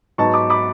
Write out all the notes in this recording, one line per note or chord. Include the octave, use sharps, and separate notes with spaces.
G#2 F#3 B3 A5 C#6
B5 D6
B5 D6